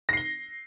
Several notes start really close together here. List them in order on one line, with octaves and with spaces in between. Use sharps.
A#6 C7 G7